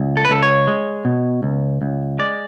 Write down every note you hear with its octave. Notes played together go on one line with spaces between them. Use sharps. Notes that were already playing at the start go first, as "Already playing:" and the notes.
Already playing: C#2
A4
B4
C#2 A4
C#5
G#3
B2
C#2
C#2
G#3 D5